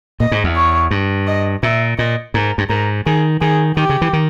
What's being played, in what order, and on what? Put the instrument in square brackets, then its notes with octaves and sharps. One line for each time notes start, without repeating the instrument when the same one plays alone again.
[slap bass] A#2 [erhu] D#5
[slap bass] G#2
E2
[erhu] C#5
[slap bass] G2
[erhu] D#5
[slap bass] A#2 [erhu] E5
[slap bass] A#2 [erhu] D#5
[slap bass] G#2 [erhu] A#4
[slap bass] G2
[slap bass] G#2 [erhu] A#4
[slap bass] D#3 [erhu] G#4
[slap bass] D#3 [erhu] G#4
[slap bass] D#3 [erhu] G4
[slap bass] C#3
E3
D#3